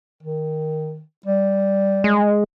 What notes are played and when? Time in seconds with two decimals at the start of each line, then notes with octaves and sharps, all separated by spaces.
0.23 D#3
1.26 G3
2.04 G#3